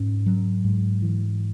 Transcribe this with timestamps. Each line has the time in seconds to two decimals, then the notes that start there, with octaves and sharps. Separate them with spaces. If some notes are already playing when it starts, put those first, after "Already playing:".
Already playing: G#2 C#4
0.26 F#3
0.64 G#2
1.02 E3